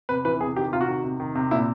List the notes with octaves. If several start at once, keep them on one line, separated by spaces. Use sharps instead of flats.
C3 B4
E3 B4
C3 G#4
D#3 G4
C3 F4
F#4
D#3
C3
D#3
C3
A#2 E4